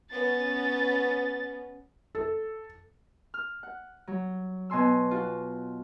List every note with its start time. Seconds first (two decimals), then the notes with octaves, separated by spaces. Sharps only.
0.11 B3 C#4 A6
2.15 A4
3.34 F6
3.63 F#5
4.07 F#3
4.70 B2 G#5 C6 E6
5.11 F4 F#4